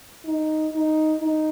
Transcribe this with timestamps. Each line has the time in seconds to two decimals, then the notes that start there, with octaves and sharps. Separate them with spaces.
0.25 D#4
0.72 D#4
1.20 D#4